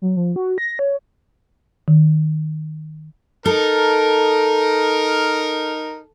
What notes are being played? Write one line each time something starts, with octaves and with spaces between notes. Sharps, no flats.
F#3
F3
F#4
A#6
C#5
D#3
D#4 A4 A#4